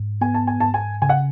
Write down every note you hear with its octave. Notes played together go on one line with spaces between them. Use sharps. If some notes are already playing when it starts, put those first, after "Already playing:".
Already playing: G#2
B3 G#5
A5
G#5
G#2 A5
G#5
C#3 G#5
F#5